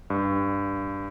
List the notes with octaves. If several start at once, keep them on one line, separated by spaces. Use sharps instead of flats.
G2